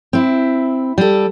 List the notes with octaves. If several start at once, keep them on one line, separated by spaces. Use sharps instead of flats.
C4 E4
G3 A4